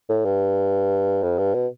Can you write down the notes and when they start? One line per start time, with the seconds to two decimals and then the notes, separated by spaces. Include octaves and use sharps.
0.09 A2
0.25 G2
1.23 F2
1.39 G2
1.54 B2